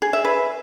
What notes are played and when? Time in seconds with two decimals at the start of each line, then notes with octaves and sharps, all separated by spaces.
0.02 G#4
0.13 E5
0.25 B4